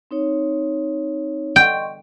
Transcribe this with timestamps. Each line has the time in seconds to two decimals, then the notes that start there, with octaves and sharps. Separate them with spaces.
0.11 C4 D#4 C#5
1.56 D#5 G5 C6 C#6